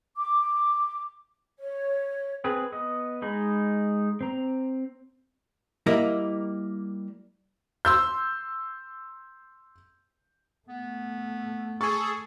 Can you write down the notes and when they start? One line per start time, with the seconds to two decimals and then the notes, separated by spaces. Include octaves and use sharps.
0.17 D6
1.60 C#5
2.44 C4 G#4 B4
2.72 B3 D#5
3.22 G#3 D#4 B5
4.21 C4 A#5
5.86 G3 A#3 E4 A#4 D#5
7.85 C6 E6 G6
10.69 A3 B3
11.81 G#4 A4 C#6